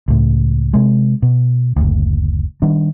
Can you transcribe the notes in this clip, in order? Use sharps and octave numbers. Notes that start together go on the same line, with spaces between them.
C#2 A2
C3 G#3
B2
F#1 D2
D#3 G3 D4